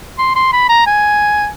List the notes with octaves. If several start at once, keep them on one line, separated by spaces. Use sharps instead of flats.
C6
C6
B5
A#5
G#5